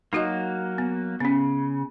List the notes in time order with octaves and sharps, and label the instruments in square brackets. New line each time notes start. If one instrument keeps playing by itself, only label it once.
[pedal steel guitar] F#3 A#3 [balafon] D#4 F#4 D#5
[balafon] B3
[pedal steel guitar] C#3 [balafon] B3 C#4